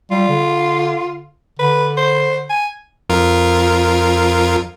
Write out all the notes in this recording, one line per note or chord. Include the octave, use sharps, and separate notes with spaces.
G3 F4
D3
D3 B4
C5
G#5
F2 F4 A#4